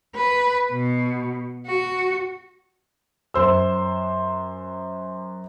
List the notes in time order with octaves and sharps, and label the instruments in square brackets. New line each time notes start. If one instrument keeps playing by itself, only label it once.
[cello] B4
B2
F#4
[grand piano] F#2 C5 E6